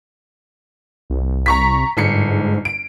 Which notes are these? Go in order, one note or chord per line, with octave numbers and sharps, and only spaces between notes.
C2
A#5 C#6 B6
G1 G#2 C7 C#7
D7